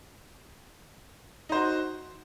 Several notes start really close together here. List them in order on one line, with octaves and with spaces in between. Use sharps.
D#4 C5 F#4